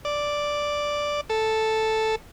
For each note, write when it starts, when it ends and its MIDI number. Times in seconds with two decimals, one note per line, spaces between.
0.05 1.21 74
1.30 2.15 69